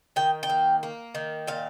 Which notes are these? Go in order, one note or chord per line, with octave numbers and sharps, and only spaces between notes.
D#3 G5
G5
A#3
A#3
D#3
A#2 F5